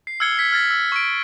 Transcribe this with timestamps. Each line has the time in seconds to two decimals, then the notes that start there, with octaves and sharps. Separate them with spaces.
0.07 C7
0.20 E6 F6 G#6 C#7 G7
0.38 G#6 B6 C#7
0.52 F6 G#6 A6 B6
0.71 E6
0.92 C#6 D7